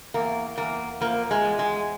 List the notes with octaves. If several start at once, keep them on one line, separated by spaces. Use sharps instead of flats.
E2 A#3
E2 A#3
F3 A#3
G#3
E2
G#3